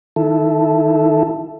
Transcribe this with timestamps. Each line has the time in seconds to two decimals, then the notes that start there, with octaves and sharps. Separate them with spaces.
0.16 D#3 E4 A4